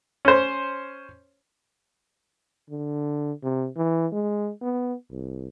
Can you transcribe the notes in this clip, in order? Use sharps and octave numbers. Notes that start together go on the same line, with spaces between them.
C#4 C5
D3
C3
E3
G#3
B3
C2